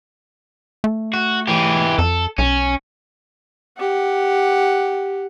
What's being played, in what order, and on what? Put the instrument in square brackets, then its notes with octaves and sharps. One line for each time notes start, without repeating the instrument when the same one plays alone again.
[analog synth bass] A3
[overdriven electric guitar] F#4
E3 G4
[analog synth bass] F2 [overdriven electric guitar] A4
[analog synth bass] B1 [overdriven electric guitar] C#4
[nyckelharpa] G4 F#5